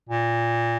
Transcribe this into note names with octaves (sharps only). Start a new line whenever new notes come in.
A#2